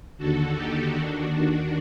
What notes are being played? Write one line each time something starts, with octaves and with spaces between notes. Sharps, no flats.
D#2 D3 F#4 A4
D#4 G4
D#2 D#3 D4 F#4
D4